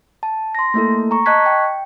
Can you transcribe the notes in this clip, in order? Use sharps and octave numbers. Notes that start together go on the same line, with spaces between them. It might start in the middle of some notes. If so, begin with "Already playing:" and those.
A5
C6 A#6
A3 A#3 E4 A4
A#5 C#6
D#5 A5 C#6 F#6 G#6 B6
G5